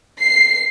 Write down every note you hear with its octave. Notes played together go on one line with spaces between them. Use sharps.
C7